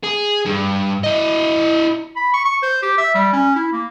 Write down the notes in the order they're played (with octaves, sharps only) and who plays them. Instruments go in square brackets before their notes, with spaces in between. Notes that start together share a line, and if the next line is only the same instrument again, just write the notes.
[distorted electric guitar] G#4
G2
E4 D#5
[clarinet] B5
C#6
C#6
C5
G4
E5
G3
C#4
E4
A#3